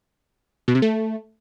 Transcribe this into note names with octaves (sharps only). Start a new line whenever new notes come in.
B2
C3
A3